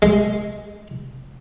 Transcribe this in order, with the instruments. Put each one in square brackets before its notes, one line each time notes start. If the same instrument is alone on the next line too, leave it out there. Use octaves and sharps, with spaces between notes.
[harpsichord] G#3